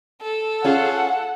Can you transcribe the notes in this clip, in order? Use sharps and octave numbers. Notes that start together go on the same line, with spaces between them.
A4
C#4 F4 G#4 F#5